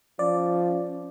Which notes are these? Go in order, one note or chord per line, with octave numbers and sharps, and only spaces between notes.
F3 C#4 D5